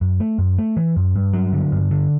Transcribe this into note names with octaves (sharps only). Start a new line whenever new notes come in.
F#2
A3
F#2
A3
E3
F#2
G2
F#3
D3
G2
D3